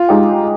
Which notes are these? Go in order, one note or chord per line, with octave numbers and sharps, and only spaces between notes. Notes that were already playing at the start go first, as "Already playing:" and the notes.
Already playing: F4
G#3 D#4 G4